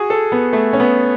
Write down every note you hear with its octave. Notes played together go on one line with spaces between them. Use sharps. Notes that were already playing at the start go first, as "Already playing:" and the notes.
Already playing: F#4 G#4
A4
B3
A3
C#4
B3